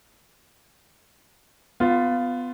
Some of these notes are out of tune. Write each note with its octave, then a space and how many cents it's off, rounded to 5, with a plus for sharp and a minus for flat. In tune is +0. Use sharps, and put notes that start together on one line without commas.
B3 +25 F4 +0